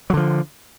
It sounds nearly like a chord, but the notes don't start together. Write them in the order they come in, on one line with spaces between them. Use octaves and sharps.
F#3 D3 F3